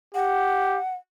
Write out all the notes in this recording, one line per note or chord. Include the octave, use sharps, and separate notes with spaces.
G4 F#5